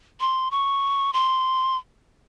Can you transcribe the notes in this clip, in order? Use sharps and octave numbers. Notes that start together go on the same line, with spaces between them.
C6
C#6
C6